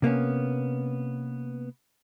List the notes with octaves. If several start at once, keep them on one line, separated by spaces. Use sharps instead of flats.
C3 A#3 B3 C#4